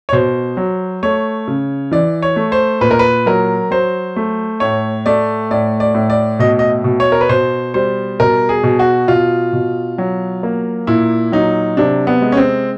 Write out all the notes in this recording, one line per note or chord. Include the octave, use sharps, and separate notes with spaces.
C#5
B2 C5
F#3
A3 C#5
C#3
E3 D5
C#5
A3
C5
A#2 B4
A#4
B4
F#3 A#4
F#3 C5
A3
A2 C#5
A3 D5
A2 D5
D5
A2
D5
B2 D#5
D#5
B2
C#5
A#4
B4
B2 C5
G3 C5
B2 A#4
G#4
B2
F#4
B2 F4
B2
F#3
A#3
A#2 E4
F#3 D#4
C3 D4
B3
G#3
C#4
C4